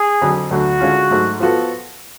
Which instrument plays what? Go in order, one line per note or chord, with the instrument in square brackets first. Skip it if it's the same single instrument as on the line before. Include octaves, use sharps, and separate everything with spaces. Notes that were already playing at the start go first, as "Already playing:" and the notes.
Already playing: [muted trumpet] G#4
[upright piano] F2 D3 F#3
[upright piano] D2 D3 F#3 [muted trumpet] F#4
[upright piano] D3 G#3 C#4 F4
G#2 F#3 A3
F3 B3 F#4 A4